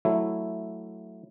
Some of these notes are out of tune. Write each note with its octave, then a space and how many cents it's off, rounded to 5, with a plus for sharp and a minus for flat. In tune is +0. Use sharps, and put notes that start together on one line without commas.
F#3 +0 A3 +0 E4 +0